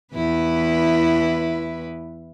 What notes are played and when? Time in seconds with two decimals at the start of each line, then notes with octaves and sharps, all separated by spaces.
0.14 E2 E4 B4